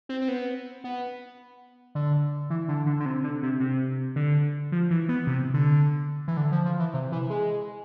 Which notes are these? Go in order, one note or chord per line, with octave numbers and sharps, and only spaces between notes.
C4
C4
B3
B3
D3
E3
D3
D3
D3
C3
D3
C3
C3
D3
F3
E3
B3
C3
D3
E3
D3
F3
F3
E3
C3
E3
G#3